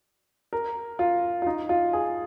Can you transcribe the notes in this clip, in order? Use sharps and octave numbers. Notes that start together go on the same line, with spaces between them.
A#4
F4
F4
D#4
F4
G#4